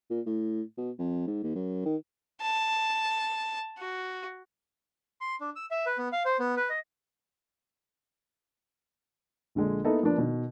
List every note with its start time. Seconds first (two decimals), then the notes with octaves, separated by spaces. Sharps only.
0.10 A#2
0.26 A2
0.78 B2
0.99 F2
1.27 G#2
1.43 D#2
1.55 F#2
1.85 D#3
2.41 A5
3.78 F#4
5.21 C6
5.41 D4
5.56 E6
5.71 E5
5.86 B4
5.98 B3
6.12 F5
6.25 C5
6.40 B3
6.56 B4
6.69 D#5
9.55 A#1 D3 G#3
9.84 A#3 B3 D#4 E4 A4
10.03 F3 A#3 B3 D4
10.18 B2 D#3